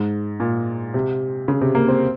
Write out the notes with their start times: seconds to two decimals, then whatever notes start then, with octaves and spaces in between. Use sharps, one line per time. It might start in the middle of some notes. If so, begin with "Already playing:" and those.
Already playing: G#2
0.40 A#2
0.94 C3
1.48 C#3
1.61 C3
1.75 A#3
1.88 C4